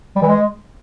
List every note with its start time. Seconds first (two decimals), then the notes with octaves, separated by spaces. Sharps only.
0.16 G3
0.22 E3
0.28 G#3